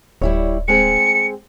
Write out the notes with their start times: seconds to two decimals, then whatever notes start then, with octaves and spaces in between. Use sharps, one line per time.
0.22 D1 G3 E4 C#5
0.68 G#3 C4 G#4 C#7